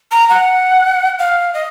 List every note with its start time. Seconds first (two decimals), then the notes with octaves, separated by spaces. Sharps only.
0.12 A#5
0.29 F#5
1.19 F5
1.54 D#5